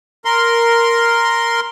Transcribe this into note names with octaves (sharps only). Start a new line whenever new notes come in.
A#4 C6